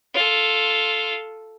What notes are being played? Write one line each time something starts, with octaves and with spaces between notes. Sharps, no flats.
F4 A4